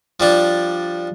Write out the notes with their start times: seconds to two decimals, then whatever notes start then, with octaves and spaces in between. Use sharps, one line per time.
0.20 F3 G3 D4